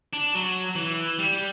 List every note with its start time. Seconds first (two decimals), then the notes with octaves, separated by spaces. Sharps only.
0.13 D4
0.34 F#3
0.76 E3
1.19 G3